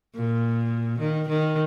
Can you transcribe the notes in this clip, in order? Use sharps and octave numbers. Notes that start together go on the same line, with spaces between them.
A#2
D#3
D#3